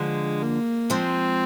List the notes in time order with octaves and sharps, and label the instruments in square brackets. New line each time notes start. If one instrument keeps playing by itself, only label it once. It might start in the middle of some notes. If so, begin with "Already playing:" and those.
Already playing: [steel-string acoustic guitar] D3 F3 [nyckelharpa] G#3
[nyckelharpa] A#3
[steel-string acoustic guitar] F3 G#3 [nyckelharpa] C4